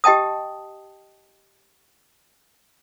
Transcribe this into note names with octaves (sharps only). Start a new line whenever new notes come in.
G4 D#5 G5 A5 D#6